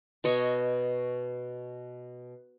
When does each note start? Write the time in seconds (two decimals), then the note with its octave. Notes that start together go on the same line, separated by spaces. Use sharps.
0.24 B2 C#5 D#5 C#6